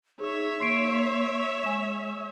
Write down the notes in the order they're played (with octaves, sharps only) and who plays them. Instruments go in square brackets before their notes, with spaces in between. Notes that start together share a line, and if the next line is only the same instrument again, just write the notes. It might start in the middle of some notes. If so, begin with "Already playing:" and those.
[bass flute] D#4 [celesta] G#4 [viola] C#5 E5
[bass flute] A#3 [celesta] C6 C7 D7
[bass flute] G#3 [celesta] G#5 E7